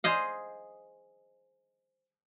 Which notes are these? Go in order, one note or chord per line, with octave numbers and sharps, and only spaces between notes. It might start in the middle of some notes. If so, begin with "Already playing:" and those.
G#4 C5 D#5 F5